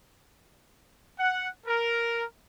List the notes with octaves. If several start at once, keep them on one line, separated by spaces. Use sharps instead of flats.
F#5
A#4